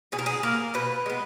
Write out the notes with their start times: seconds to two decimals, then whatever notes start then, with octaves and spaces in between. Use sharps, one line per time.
0.12 B2 G#4
0.19 A#4
0.26 G#4
0.43 A#3 A#4
0.74 B2 B4
1.06 G#3 B3